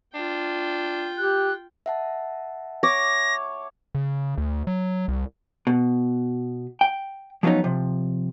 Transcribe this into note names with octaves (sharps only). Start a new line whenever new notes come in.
D4 F4 G5
G4 F#6
E5 F#5 A5
C#5 D6 A#6
C#3
D2
F#3
C2
B2
G5
F3 F#3 B3 C#4 D#4
C3 F3